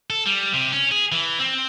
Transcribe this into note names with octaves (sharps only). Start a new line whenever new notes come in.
A4
G3
C3
C#4
G#4
E3
C4